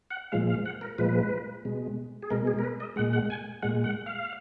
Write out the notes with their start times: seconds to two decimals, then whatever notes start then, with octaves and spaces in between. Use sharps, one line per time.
0.10 F#5
0.32 A#2 F3 G#3 F5
0.50 F5
0.65 F#5
0.81 A#4
0.98 A#2 F3 G#3 B4
1.65 B2 G#3
2.22 G#4
2.30 B2 G#3 A#4
2.47 G#4
2.59 A#4
2.63 B4
2.80 D#5
2.96 A#2 G#3 F#5
3.13 F#5
3.30 G#5
3.62 A#2 G#3 F#5
3.84 F#5
4.06 F5